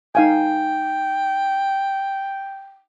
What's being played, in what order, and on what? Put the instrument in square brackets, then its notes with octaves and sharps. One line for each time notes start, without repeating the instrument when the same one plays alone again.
[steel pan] D#4 F5 G#5 [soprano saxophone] G5